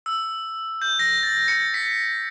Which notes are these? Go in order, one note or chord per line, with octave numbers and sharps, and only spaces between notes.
E6
G6
A#6
A6
C#7
B6